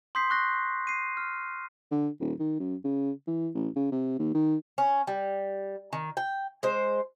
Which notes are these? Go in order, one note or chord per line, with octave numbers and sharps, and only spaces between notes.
C6 D#6 G6 B6 C7
C#6 F#6 A#6 C7
C7 D#7
F6
D3
D#1
D#3
F#2
C#3
E3
A1
C#3
C3
D#2
D#3
C#4
G3
D#3
G5
G#3 C5